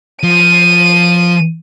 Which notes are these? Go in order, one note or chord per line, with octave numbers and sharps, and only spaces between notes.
F3 D#7